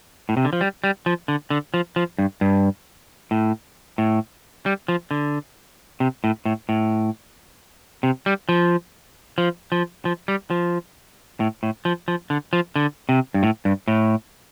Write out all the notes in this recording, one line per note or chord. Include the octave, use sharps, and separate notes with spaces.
A2
C3
D3
F3
G3
G3
F3
D3
D3
F3
F3
G2
G2
A2
A2
G3
F3
D3
C3
A2
A2
A2
C3
G3
F3
F3
F3
F3
G3
F3
A2
A2
F3
F3
D3
F3
D3
C3
G2
A2
G2
A2